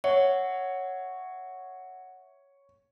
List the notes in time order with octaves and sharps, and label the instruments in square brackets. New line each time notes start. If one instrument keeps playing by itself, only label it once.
[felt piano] C#5 [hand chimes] E5 F#5